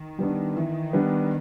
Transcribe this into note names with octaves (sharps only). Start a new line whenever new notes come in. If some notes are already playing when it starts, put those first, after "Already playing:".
Already playing: D#3
G3 B3 D4
E3
G3 B3 D4